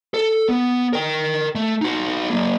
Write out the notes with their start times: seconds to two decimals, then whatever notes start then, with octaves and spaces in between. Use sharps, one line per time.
0.14 A4
0.49 B3
0.93 A#4 G5
1.55 A3
1.81 D#4 F#4
2.30 F#3 A#3